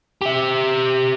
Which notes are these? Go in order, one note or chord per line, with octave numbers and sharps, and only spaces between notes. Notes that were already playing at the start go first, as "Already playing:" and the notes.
G4 E5